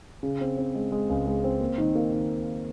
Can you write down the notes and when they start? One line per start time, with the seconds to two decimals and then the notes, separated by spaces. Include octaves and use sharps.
0.23 C#3
0.41 C4
0.57 C4
0.75 G#3
0.92 G#3
1.09 C#2
1.26 G#3
1.44 C4
1.60 A#3
1.78 D#3
1.95 A#3
2.12 D#3